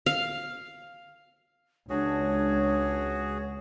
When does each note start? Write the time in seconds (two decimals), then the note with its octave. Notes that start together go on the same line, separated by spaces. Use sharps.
0.06 F5
1.90 C#2 D4 F#4 G#4 C#5